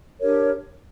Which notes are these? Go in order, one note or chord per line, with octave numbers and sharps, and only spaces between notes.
D4 G4 A#4 C#5